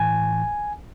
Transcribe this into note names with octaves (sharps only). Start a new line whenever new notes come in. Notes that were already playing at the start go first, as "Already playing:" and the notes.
Already playing: A2 E3 G#5